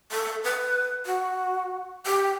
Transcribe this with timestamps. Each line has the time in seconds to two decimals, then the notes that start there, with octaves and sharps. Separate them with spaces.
0.12 A4
0.44 B4
1.06 F#4
2.06 G4